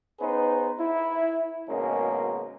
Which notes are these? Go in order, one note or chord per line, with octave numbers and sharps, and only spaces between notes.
B3 C#4 D#4 G#4 B4 C5
E4
G#1 B2 G#3 A#3 C#4